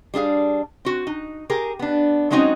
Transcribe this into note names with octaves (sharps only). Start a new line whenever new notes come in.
G3 D4 G#4 F5
C4 F#4
D#4
G4 G#4 A#4
B3 D4
F#3 G#3 C4 C#4 D#4 F#4